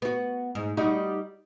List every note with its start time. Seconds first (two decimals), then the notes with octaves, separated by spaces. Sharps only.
0.02 B3 F#4
0.55 G#2
0.77 G3 D#4 F#4